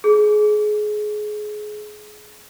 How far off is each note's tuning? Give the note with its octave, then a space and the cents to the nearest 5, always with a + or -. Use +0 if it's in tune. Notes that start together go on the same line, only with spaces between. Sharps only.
G#4 +25